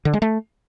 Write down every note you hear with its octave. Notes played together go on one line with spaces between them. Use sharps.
D3
G#3
A3